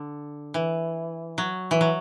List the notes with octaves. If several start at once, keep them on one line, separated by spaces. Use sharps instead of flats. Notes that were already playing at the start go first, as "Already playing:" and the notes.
Already playing: D3
E3
F#3
E3
F#3